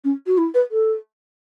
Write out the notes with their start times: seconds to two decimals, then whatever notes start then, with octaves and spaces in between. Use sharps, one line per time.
0.04 C#4
0.26 F#4
0.38 E4
0.54 B4
0.71 A4